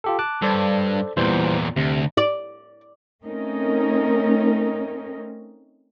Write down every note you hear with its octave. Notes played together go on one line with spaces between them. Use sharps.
F4 G4 A4
A5 D6 F#6
G2 A4 C5 D5
E2 A#2 E3 G3 C5
D2 C3
D5
A3 C4 C#4 D#4 A#4